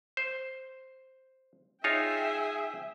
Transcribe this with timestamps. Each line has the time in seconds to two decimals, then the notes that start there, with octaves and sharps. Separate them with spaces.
0.17 C5
1.84 D#4 F4 G#4 C#5 E5 G5